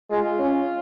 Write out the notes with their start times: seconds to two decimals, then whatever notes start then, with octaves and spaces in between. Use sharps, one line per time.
0.11 G#3 F4
0.39 C#4